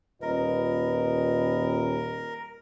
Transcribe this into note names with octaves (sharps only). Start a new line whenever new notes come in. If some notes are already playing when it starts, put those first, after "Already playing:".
D#1 F4 A#4 B4 D#5